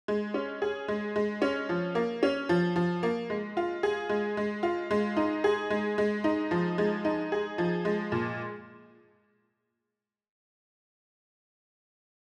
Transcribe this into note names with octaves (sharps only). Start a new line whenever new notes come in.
G#3
C#4
G#4
G#3
G#3
C#4
F3
A#3
C#4
F3
F3
A#3
G#3
F4
G#4
G#3
G#3
F4
G#3
D#4
G#4
G#3
G#3
D#4
F3
G#3
D#4
G#4
F3
G#3
A#2